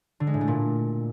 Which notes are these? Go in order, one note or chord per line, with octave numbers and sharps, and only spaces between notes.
D3
G#3
A2
A3
A#2